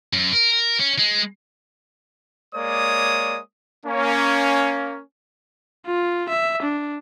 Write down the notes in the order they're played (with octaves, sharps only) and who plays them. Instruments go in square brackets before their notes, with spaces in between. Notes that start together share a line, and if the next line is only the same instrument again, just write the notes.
[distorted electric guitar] F#2
A#4
C#4
G#3
[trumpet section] G#3 A#3 C#5 D5 D#6
A#3 C#4
[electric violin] F4
E5
D4